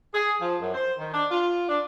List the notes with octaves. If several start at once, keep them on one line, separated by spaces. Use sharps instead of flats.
G#4
F3
F#2
C5
D#3
D4
F4
D4